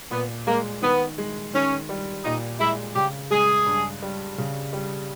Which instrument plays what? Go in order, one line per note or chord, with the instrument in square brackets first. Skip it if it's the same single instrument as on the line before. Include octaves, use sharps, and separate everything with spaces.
[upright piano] A#2 [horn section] B3
[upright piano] G#3 [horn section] A#3
[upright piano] D#3 [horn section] B3
[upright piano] G#3
[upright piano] D#3 [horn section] C#4
[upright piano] G3
[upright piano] A#2 [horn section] D#4
[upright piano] G#3 [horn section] E4
[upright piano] C#3 [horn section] G4
[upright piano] G#3 [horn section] G#4
[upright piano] G2
G3
C#3
G3